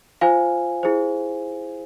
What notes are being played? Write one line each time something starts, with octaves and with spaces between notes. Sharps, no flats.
F4 C5 F5 G#5
E4 G#4 C5